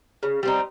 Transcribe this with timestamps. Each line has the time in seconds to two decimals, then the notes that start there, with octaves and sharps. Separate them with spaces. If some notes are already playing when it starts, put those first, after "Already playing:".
0.23 C#3
0.43 G3 C4 D#4